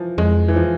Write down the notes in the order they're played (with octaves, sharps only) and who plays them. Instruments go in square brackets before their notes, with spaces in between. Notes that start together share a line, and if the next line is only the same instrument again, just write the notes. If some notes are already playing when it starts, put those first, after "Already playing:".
Already playing: [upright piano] E3 F3
[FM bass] F2 [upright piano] G#3
[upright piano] E3
F3